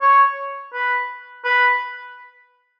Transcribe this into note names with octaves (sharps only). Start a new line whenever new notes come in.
C#5
B4
B4